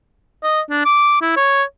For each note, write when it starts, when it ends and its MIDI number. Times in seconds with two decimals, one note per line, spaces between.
0.43 0.61 75
0.70 0.82 62
0.85 1.20 86
1.22 1.32 64
1.37 1.63 73